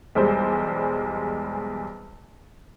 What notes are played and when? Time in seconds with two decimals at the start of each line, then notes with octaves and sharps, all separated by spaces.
0.15 B1 E2 G3 G#3 C5 G6